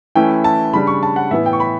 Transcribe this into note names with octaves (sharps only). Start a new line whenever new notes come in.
E3 A3 C#4 E4 G5
A5
C#3 G3 D4 B5
C#6
A5
F#5
A2 E3 B3 E4 E5
G5
C#6
B5